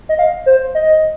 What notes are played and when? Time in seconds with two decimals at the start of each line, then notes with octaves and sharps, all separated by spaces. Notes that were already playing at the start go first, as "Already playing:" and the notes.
0.09 D#5
0.19 F5
0.46 C5
0.75 D#5